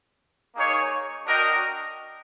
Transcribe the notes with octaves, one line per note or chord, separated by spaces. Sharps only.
A#3 D#4 G#4 C#5
D4 F#4 A#4 D#5 G5